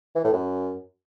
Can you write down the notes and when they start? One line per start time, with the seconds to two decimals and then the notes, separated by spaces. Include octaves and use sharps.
0.16 E3
0.24 A2
0.33 F#2